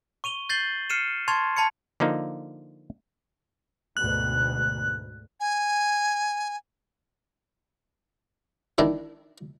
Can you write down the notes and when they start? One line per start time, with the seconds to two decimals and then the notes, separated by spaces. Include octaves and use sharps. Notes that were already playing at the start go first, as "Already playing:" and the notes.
0.24 C#6 D#7 F7 G7
0.49 G6 A6 C7 F#7 G7
0.90 F6 C7 C#7 D#7 E7
1.28 A5 C6 C#6 G#6 A6 F7
1.57 A5 B5 G#6 C#7
2.00 D3 F3 A#3 D#4
3.97 D2 G#2 B2 F#6
5.40 G#5
8.78 D#3 D4 E4